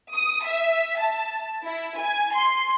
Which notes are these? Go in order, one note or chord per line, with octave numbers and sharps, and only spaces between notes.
D#6
E5
A5
E4
G#5
C6